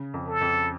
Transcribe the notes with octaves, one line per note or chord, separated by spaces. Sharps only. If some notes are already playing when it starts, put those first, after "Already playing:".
Already playing: C#3
F2
A4
F2